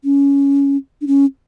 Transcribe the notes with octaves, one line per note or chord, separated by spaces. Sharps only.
C#4
D4
C#4